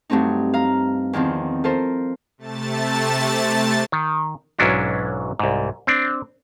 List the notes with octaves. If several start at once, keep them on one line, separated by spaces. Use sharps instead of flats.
G2 F#3 A3 C4 D#4
F5 A#5
E2 D#3 F3 C4
F4 A4 A#4 C5
C3 A3 A5 A6
D#3
B1 G#2 F#3 C#4 D4 E4
C2 G#2
C4 D4